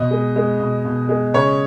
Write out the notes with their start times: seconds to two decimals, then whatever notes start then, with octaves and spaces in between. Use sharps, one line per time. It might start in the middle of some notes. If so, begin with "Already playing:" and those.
Already playing: B2 D#5
0.11 G#3
0.36 G#3
0.60 B2
0.85 B2
1.09 G#3
1.34 C#3 C#5